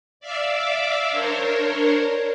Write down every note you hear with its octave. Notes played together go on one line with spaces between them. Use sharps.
D5 E5 F5 D6 E6
D4 A#4 C5 C#5